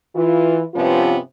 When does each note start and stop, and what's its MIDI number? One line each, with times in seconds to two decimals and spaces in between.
0.15 0.61 52
0.15 0.61 65
0.74 1.16 43
0.74 1.16 48
0.74 1.16 53
0.74 1.16 59
0.74 1.16 61
0.74 1.16 65